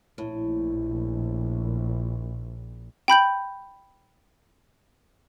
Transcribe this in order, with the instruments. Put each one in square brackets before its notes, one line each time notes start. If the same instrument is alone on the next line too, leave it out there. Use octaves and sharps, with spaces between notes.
[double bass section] A#1 [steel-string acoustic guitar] A2
[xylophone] G5 B5 G6 F#7